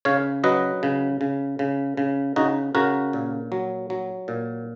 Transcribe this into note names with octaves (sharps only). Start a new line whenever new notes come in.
C#3 C#5 F5
F#3 B4 D#5
C#3
C#3
C#3
C#3
C#3 D#4 F#4
C#3 F#4 A#4
A#2
F#3
F#3
A#2